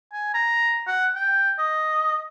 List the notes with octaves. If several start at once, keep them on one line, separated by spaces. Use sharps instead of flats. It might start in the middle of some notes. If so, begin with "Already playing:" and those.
G#5
A#5
F#5
G5
D#5